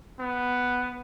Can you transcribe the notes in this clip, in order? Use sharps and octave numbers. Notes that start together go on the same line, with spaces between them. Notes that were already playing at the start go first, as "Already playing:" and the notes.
B3